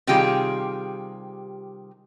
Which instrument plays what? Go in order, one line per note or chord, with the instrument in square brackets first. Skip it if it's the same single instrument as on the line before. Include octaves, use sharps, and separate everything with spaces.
[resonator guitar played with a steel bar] C3 D#3 G3 F4 G4 G#4